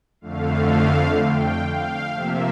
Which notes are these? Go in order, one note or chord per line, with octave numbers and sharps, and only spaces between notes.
F2 D3 A3 F5
G5
F5
C3 F3 A#3 E5